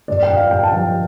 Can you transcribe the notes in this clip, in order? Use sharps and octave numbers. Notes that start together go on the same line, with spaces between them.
G2 D5
G5
G2
F5
G2 G5
A5
F3 G5